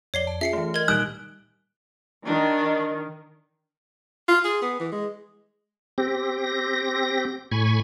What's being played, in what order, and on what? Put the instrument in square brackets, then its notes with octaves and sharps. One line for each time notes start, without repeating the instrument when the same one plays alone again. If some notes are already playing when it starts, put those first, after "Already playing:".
[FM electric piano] F2 D5 [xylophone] C#5 C7 G7
[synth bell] A5
[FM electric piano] C#4 F4 G#4 [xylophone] E5 C7 C#7
[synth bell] E3 A3
[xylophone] A#4 G#6 [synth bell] D#5
[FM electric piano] A#2 D#3 G3 [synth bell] D#4 D7 G7 [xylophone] D#6 [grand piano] F#6
[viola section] D#3 [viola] D4
[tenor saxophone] F4
G#4
B3
E3
G#3
[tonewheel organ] C4 G4 A#6
A2 G#5 B5 C#6 G#6